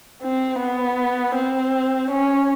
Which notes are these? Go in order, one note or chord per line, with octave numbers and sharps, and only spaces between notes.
C4
B3
C4
C#4